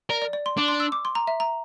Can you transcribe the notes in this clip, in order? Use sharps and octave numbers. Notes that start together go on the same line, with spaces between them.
A#4 D5
D5
D5
C6
D4 D6
C6
E6
D6
C6
A#5
E5
A#5